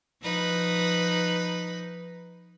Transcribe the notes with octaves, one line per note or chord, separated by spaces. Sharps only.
F3 D#4 B4